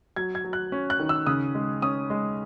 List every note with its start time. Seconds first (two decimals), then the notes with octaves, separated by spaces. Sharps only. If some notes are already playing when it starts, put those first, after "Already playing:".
0.16 F#3 G#6
0.35 G#6
0.44 F#3
0.53 F#6
0.72 C#4
0.90 F#6
1.00 D#3
1.09 E6
1.27 C#3 D#6
1.55 G#3
1.82 C#4 D#6
2.10 G#3